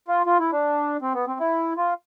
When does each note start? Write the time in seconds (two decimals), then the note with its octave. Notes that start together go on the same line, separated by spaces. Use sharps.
0.08 F4
0.26 F4
0.40 E4
0.52 D4
1.02 C4
1.14 B3
1.27 C4
1.40 E4
1.77 F4